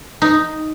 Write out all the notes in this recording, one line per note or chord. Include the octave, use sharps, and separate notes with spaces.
D#4